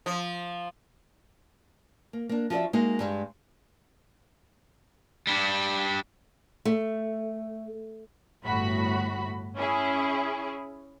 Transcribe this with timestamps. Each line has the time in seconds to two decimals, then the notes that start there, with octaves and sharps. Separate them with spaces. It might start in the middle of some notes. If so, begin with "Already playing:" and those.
0.06 F3
2.13 A#3
2.29 A#3 D4
2.50 F3 F#4 G4 D5 E5
2.73 G#3 A#3 D#4 F#4
2.99 G2 G3 G#3
5.27 G3 D4
6.65 A3
8.44 G1 A2 F#4 B5
9.56 C#4 E4 G#4